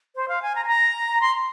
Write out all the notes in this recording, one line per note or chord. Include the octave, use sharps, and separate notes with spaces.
C5
F5
G#5
A#5
G#5
A#5
C6